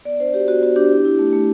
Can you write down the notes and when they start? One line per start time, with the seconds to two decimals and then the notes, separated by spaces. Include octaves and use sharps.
0.05 B3 D5
0.20 D4 C5
0.34 F#4 G4
0.47 B3 F#4
0.62 B3 F#4
0.76 D4 G4
0.91 E4
1.05 E4
1.19 A3
1.33 A3